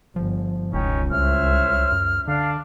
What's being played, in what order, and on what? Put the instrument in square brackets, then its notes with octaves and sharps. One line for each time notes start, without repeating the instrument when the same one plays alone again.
[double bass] G1 [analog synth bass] F3
[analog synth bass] E1 [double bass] C#2 [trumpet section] C#4 D#4 G5
[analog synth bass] C2 [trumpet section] C5 C#5 E5 [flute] F6
[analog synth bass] F#2
[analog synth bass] D3 [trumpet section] D4 [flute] F5